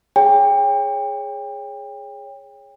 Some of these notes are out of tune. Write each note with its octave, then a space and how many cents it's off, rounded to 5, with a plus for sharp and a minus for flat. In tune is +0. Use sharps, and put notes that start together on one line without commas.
G#4 +0 C#5 +0 G5 +30